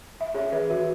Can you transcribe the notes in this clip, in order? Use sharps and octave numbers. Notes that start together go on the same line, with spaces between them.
E5
C#4 G#4 C#5
E3 B4 E5
E3 F#4 B4